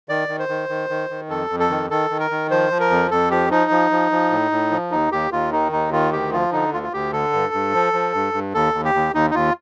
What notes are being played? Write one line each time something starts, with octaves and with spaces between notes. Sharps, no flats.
D#3 D5
D#3
C5
D#3
D#3
D#3
D#3
F2 A4
F2
A4
D#3
D#3 A4
D#3
A#4
D#3
F3 C5
F3
A#4
F2
F2 A4
F3 G4
F3 D#4
F3
F3
F3
A2
A2
F3
D#2 D#4
D#2 G4
D#2 F4
D#3 D#4
D#2 D#4
D#3 F4
D2 G4
F3 F4
D3 D#4
D2 F4
F4
D2 G4
D3 A4
G2
G2
F3
F3
G2
G2
D#2 A4
D#2
G4
D#2
D#2 D#4
D#4
D#2 F4